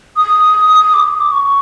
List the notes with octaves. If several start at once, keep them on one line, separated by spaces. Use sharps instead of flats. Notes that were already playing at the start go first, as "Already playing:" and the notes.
D#6
D6
D#6
D6
C#6